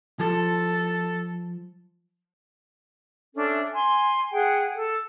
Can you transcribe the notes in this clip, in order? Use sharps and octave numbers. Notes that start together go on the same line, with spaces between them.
F3 A4
C#4 D4 A4 E5
G#5 C6
G#4 F#5 G5
A4